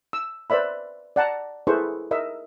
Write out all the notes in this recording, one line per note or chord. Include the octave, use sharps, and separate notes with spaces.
E6
B4 C5 D5 E5 B5
D5 F#5 A5 A#5
E4 G#4 A4 B4 C5 C#6
A#4 D#5 E5